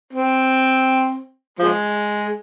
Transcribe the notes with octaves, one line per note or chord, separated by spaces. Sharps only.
C4
F3 G#3